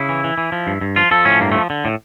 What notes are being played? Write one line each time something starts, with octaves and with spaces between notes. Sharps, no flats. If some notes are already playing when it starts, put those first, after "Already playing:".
Already playing: C#3 E4
E3
E3
E3
F3
G2
G2
F3 F4
F3 A4
A2 C#4
G2 A#3
F3 A3
D3
A2